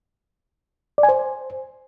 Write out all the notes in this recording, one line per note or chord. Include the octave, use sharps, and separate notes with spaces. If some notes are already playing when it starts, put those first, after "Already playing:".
D5
G#5
C5